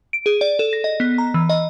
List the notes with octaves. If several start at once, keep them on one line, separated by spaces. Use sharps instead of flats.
D7
G#4
D5
A4
A#6
D#5
B3
A#5
E3
D#5